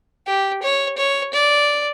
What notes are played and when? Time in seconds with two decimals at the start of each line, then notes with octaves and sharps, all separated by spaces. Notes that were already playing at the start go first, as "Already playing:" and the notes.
0.26 G4
0.62 C#5
0.97 C#5
1.34 D5